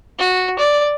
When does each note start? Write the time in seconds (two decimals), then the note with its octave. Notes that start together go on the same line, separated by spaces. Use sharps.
0.19 F#4
0.59 D5